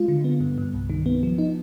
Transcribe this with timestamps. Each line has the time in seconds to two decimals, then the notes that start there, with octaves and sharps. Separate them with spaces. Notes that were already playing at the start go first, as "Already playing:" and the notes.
Already playing: G#3 F4
0.08 D3
0.24 B3
0.41 G2
0.58 G2
0.74 C2
0.90 D#3
1.06 B3
1.23 F3
1.38 D#4